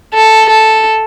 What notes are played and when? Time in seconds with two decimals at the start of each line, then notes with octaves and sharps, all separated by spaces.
0.14 A4
0.49 A4